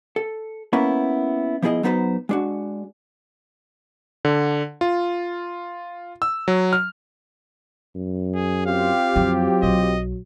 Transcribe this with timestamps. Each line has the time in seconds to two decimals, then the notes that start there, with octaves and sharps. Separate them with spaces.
0.16 A4
0.73 A#3 B3 C#4 E4 A#4 B4
1.62 F3 B3 E4 G#4 D#5
1.83 F#3 B3 D#4 B4 C5 A#5
2.29 G#3 D4 F#4
4.25 D3
4.81 F4
6.22 E6
6.48 F#3
6.73 F6
7.95 F#2
8.34 G#4
8.66 C4 F4 G4 F5
9.16 F2 F#3
9.63 B1 D#5